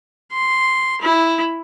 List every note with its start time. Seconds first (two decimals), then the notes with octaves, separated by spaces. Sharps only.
0.33 C6
1.02 E4